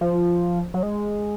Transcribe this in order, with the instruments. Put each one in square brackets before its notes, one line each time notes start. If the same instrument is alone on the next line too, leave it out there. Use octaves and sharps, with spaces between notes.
[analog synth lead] F3
F#3
G#3